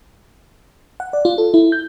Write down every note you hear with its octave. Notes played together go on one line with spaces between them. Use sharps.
F#5
D5
F4
A4
E4
G6